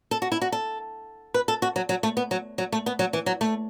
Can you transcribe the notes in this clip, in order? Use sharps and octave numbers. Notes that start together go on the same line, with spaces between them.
A4
F#4
E4
F#4
A4
B4
A4
F#4
F#3
F#3
A3
B3
F#3
F#3
A3
B3
F#3
E3
F#3
A3